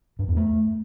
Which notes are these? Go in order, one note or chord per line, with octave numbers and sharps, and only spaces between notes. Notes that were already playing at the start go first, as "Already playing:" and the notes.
G2
E2
A3